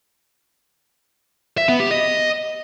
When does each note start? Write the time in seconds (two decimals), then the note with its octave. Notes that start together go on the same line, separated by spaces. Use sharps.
1.58 E5
1.69 B3
1.80 G4
1.91 D#5